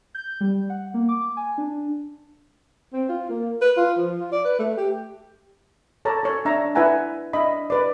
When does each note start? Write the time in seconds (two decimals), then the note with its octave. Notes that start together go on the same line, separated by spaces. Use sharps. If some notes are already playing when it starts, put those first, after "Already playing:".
0.15 G6
0.41 G3
0.70 F#5
0.94 A#3
1.09 D6
1.37 G#5
1.58 D4
2.93 C4
3.09 F4
3.30 A#3
3.62 B4
3.77 F4
3.98 F3
4.19 F4
4.32 D5
4.45 B4
4.59 A3
4.77 G4
6.05 A4 C#5 A5 A#5 D6
6.23 A4 C#5
6.45 D4 E5 A#5 E6
6.75 E4 B4 E5 F#5 G#5 A#5
7.33 D4 D#5 E5 B5
7.70 B4 D5